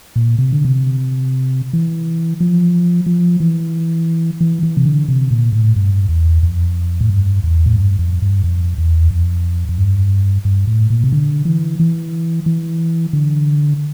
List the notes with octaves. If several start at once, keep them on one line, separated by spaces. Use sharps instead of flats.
A#2
C3
D3
C3
E3
F3
F3
E3
E3
E3
C3
D3
C3
A#2
A2
G2
E2
F2
A2
G2
E2
A2
G2
F2
G2
F2
E2
F2
F2
G2
G2
A2
A#2
C3
D3
E3
E3
E3
D3